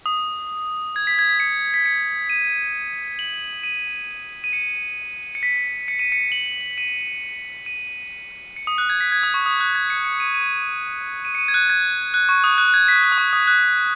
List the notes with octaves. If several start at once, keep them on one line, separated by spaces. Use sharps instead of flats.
D#6
G#6
B6
G#6
B6
C#7
B6
C#7
D#7
F#7
D#7
D#7
C#7
C#7
B6
C#7
D#7
C#7
F#7
D#7
D#7
C#7
D#6
F#6
G#6
B6
G#6
D#6
C#6
D#6
F#6
G#6
C#7
C#7
D#7
D#7
D#7
C#7
D#7
G#6
F#6
G#6
F#6
C#6
D#6
F#6
F#6
G#6
B6
F#6
D#6
C#6
D#6
F#6